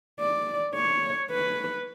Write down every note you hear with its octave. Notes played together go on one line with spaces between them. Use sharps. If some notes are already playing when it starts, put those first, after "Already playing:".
D5
C#5
B4